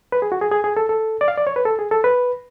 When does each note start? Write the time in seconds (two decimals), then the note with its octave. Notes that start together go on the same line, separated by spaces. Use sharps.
0.12 B4
0.22 G#4
0.32 F#4
0.41 G#4
0.52 G#4
0.64 G#4
0.77 A4
0.89 A4
1.21 D5
1.28 F5
1.38 D5
1.47 C#5
1.56 B4
1.65 A4
1.79 G#4
1.91 A4
2.04 B4